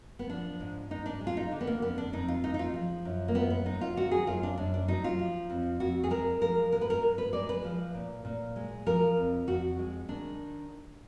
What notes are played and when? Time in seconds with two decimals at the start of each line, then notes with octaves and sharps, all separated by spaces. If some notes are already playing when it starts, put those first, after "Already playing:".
0.19 B3
0.29 F3 D4
0.60 G#2
0.91 G#2 D#4
1.06 D4
1.21 G#3
1.27 F4
1.37 D#4
1.51 D3 D4
1.61 B3
1.67 A#3
1.82 F2 B3
1.98 D4
2.13 F2 D#4
2.28 F4
2.44 G#3 D#4
2.54 D#4
2.59 F4
2.74 F3
3.05 F#2
3.28 A#3
3.35 F#2 B3
3.50 B3
3.66 G#3 D#4
3.81 F4
3.96 D#3 F#4
4.11 G#4
4.27 F#2 F4
4.43 D4
4.58 F#2 D4
4.74 D4
4.88 F#3 D#4
5.04 F4
5.19 F3
5.50 F2
5.80 F2 F#4
6.04 G#4
6.10 G#3 A#4
6.41 F3 A#4
6.72 G#2 A#4
6.81 B4
6.90 A#4
7.02 G#2
7.18 B4
7.33 G#3 D5
7.49 B4
7.64 F3
7.95 A#2
8.25 A#2
8.56 G#3
8.86 F3 A#4
9.17 F2
9.47 F2 F#4
9.79 G#3
10.08 D#3 D4